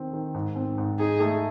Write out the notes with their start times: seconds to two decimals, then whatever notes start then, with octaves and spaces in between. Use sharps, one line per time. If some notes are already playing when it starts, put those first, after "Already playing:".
Already playing: D#3 C4
0.13 D#3
0.34 G#2
0.56 C4
0.78 G#2
0.99 D#4 G#4
1.20 A3